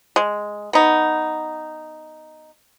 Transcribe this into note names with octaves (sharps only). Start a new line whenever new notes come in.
G#3
B3 D#4